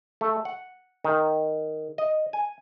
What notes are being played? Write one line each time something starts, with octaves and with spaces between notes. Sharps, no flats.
A3
F#5
D#3
D#5
G#5